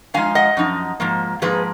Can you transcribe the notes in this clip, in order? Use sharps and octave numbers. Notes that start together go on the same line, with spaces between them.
F#2 F3 G#3 D#4 F5 G#5
D#5 F#5
F#2 F3 D#4
G#2 F3 A#3
G#2 F3 A#3 G#4 B4